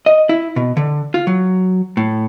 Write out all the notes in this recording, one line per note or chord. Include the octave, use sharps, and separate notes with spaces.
D#5
E4
B2
D3
F4
F#3
A2